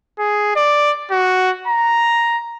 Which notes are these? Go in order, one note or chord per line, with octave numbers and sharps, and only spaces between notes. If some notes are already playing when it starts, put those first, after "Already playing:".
G#4
D5
F#4
A#5